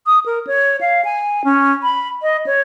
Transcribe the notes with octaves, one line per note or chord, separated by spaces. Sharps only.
D#6
A#4
C#5
F5
G#5
C#4
B5
D#5
C#5